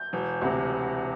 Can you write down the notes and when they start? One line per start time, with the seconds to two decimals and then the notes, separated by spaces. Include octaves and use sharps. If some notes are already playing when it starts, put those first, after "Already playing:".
Already playing: G6
0.13 E1
0.42 D2 C3